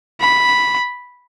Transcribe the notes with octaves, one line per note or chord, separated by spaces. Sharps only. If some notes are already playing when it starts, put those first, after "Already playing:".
B5